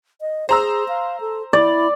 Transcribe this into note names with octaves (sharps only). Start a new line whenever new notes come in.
D#5
G#4 C5 A#5 E6
F5
A4
E4 D5